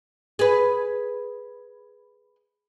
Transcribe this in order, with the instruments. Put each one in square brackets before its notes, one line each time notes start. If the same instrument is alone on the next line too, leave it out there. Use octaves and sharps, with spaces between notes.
[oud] G#4 B4